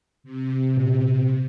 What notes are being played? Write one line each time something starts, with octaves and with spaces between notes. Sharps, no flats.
C3
A#2